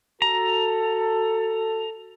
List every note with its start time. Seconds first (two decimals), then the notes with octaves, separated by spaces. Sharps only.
0.22 F#4 A4 A#5